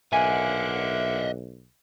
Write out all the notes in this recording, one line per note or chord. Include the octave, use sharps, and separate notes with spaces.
B1 D3 A#3 D#5 E5 F#5 G#5